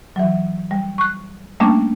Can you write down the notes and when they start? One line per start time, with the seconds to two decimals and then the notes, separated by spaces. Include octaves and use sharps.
0.16 E3 F#3
0.71 G3
0.98 C#6 F#6
1.60 G3 A3 A#3 C#4 D4